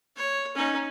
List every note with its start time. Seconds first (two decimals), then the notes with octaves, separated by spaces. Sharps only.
0.16 C#5
0.55 C#4 D#4